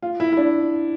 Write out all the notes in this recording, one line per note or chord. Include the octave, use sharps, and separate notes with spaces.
F4
E4
E4
D4